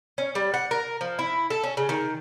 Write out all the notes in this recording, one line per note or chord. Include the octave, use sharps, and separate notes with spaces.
C#4
G3
F#5
A#4
F3
E4
A4
C#4
C#3
D#3